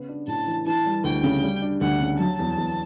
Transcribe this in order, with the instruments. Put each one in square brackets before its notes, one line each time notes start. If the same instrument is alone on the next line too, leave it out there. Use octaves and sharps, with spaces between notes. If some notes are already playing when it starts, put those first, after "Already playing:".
Already playing: [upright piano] C#3 B3
D4
[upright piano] A2 [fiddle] A5
[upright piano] E3
[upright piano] E3 [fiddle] A5
[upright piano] G3
[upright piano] D2 [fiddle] G5
[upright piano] C#3
G3
D4
[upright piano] D2 [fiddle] F#5
[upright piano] C#3
[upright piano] F#3 [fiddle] A5
[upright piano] E2
E2